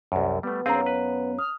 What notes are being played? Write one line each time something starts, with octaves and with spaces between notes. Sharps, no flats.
C2 F#2
G3 A3 B3
F#2 C4 C#4 D#4 G#4 F5 A#5
B4
D#6 F6